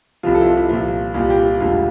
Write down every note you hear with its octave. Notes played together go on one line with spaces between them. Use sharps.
C2 C3 F3 F4
A4
E4
F4
E4
C2 A#2 F3 F4
C2 A#2 G3 F4
G4
F4
E1 D2 D3 G3 F4